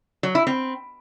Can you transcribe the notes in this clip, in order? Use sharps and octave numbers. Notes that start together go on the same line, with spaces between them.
F#3
E4
C4